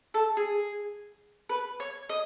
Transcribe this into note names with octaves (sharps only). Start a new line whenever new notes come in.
A4
G#4
B4
C#5
D#5